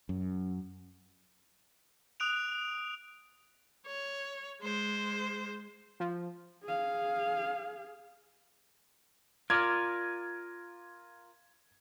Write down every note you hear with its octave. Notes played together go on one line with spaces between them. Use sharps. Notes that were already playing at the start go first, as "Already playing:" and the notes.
F#2
D#6 F#6 D7 F7
C#5
G#3 C5
F3
G#4 F5
F4 A#4 D5 G#6